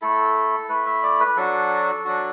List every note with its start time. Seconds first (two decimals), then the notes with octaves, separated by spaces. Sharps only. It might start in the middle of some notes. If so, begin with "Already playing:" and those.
0.02 A3 E4 A4
0.69 A3 E4 B4
0.86 E5
1.03 D5
1.20 B4
1.37 F#3 D4 F#4 A4
2.05 F#3 D4 F#4